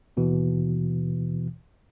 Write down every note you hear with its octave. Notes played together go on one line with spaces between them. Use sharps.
D#2 B2 E3